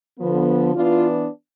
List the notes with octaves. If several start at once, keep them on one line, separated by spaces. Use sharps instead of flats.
D3 F3 B3
E3 B3 D4 F4